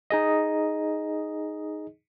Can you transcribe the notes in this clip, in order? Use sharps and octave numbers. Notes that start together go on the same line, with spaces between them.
D#4 G#4 D#5